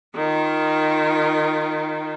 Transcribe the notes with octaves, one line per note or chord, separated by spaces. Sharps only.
D#3 F4